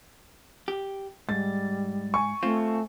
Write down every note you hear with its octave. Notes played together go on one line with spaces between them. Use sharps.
G4
G#2 G3 A6
G#5 C#6
A3 C4 F4